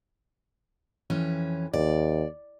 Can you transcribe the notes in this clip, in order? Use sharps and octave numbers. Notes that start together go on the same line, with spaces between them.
F2 E3 C#4
D#2 D5